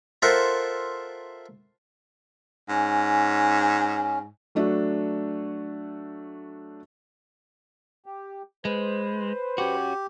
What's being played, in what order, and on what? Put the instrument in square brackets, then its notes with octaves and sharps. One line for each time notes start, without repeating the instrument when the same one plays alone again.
[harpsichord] F4 A4 A#4 C5 E5 F#5
[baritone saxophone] G#2 [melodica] C#4
[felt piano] F#3 A3 D4 F#4
[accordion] G4
[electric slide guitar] G#3 [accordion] B4 C5
[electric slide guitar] C#4 F#4 [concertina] G4